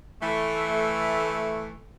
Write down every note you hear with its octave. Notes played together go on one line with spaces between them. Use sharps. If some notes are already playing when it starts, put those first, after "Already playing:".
E3 A3